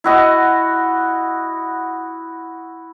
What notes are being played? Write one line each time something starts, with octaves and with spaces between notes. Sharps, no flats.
E4 F#4 D#5